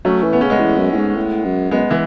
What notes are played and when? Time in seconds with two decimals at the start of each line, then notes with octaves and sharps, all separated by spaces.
0.05 F#3 A3 C#4
0.23 E3
0.33 B3
0.41 C#3 C#4
0.50 G#3 B3
0.60 E2
0.79 F#2
0.92 A2
0.98 G#2
1.16 A2
1.45 F#2
1.71 F#2 G#3 B3
1.90 E3 G#3